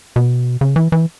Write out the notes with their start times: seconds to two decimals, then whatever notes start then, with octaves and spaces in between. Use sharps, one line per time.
0.16 B2
0.61 C#3
0.76 E3
0.92 E3